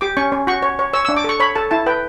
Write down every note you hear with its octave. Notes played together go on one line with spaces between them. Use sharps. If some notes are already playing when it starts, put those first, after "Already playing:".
G4 D6
C#4 C#6
C#4
F#4 C#6
C#5
C#5
C#5 E6
D4 E6
D6
A4 C#6
C#5 B5
A4 A5
E4 A5
B4 G5